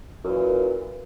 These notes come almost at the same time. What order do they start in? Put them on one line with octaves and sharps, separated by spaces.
F#2 A#2 E3